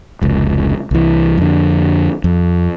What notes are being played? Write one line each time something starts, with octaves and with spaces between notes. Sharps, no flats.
F1 C#2
C2 E3
F2 D3
F2